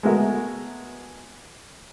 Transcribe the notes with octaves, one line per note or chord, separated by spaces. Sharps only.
G#3 A3 B3 F#4 A#4 E5